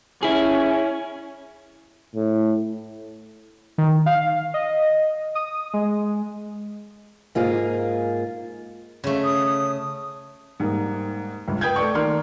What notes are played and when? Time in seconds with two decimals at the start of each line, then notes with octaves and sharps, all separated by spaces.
0.23 C#4 E4 G#4
2.16 A2
3.78 D#3
4.06 F5
4.54 D#5
5.35 D#6
5.74 G#3
7.35 G#2 A#3 F4 G#4
9.04 C#3 A3
9.24 D#6
9.47 D#6
10.60 G#2 G3 A#3
11.48 G1 C#2
11.61 B4 G5 D#6 G6 G#6
11.76 A3 A4 D5 C#6
11.94 D#3 A#3 D5 C6 F6